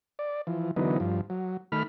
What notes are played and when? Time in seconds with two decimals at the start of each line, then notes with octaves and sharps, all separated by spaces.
0.19 D5
0.47 E3 F3
0.76 D3 E3 F#3 B3 D#4
1.00 G2 F3
1.30 F#3
1.72 D#3 A3 B5 F6